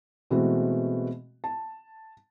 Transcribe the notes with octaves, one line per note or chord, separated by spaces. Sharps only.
B2 E3 G#3 A3 C4 F#4
A5